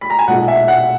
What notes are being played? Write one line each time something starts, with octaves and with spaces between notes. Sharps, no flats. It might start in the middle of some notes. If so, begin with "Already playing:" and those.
B5
A#5
G#5
B1 A#2 G#3 F#5
E5
F#5